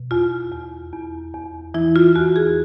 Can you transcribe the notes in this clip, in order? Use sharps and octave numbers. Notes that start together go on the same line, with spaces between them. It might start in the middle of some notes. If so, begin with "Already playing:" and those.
Already playing: B2
E2 F4
E2
E2
E2
E3 E4
F4
E2 F#4
G#4